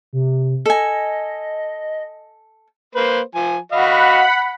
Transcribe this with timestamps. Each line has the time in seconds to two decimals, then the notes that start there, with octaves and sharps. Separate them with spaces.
0.13 C3
0.66 A4 D#5 G#5
2.95 A#3 B4 C5
3.35 F3 G#5
3.72 F#4 D#5 F5 F#5 B5